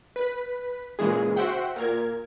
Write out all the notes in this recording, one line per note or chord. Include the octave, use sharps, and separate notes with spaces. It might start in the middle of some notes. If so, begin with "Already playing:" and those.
B4 B6
A#2 C#3 E3 G#3 G#4
F#4 C5 E5 F#5 G5
A#2 A#4 G#6